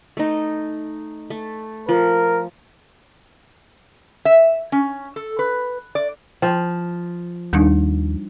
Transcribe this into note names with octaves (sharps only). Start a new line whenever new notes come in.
A3 D#4
A3
F3 A#4
E5
C#4
A4
B4
D5
F3 G5
D#2 G3 D4 D#4